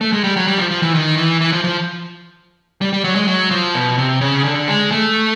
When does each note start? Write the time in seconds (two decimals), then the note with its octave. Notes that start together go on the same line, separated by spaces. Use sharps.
0.01 A3
0.12 G#3
0.24 G3
0.36 F#3
0.47 G3
0.58 F3
0.71 F3
0.82 E3
0.94 D#3
1.17 E3
1.41 E3
1.52 F3
1.64 F3
2.81 G3
2.93 G3
3.04 F#3
3.16 G#3
3.28 F#3
3.51 F3
3.74 B2
3.98 C3
4.21 C#3
4.44 D3
4.68 G#3
4.91 A3